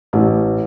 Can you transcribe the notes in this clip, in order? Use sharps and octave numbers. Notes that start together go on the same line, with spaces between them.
A1